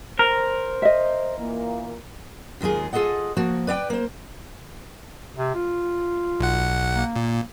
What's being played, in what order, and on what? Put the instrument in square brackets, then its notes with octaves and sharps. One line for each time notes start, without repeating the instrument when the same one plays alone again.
[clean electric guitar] A#4 [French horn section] C5
[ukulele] D#5 E5
[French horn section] A#2 E3 A#3
[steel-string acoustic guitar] D#2 D#3 G#3 F4 G#4
F4 G#4 A4 D#5 F#5
F3 A#3 F#4
B4 D5 E5 G5
A#3 C5
[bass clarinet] C3
F4
[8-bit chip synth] B1 F#5
[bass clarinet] A#3
[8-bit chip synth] A#2